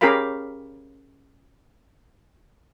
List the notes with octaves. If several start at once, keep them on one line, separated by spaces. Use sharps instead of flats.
C#4 G4 G#4 A#4 F5 B5